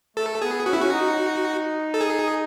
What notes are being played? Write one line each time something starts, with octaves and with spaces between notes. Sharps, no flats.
A3 A4
B3 G#4
C#4 F#4
B3 E4
C#4 F#4
D#4
A4
G#4